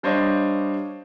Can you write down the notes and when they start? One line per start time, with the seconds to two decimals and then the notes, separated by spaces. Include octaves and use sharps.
0.03 G3 D4 C5 C#5 D#5 F5